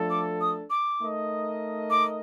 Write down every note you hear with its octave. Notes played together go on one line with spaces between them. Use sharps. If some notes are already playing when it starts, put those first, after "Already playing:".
Already playing: F3 A3 D4 A4
D6
D#6
D6
A3 D#4 A#4 D#5
D6